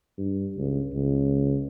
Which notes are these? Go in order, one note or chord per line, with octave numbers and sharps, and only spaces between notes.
G2
C#2
C#2